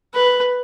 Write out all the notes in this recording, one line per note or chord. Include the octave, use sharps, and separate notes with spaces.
B4